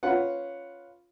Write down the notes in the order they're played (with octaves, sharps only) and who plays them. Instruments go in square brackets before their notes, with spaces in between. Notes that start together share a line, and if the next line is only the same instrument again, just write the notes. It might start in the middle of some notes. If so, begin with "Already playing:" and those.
[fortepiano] C#4 F4 B4 F#5